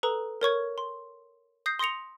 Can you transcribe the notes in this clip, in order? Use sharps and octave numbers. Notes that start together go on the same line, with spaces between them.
A4 B4 A#5 D#6
A#4 C#5 C#6 G#6
C6
D#6 G6 A#6 C7
C6 D#6 A#6 C#7 F7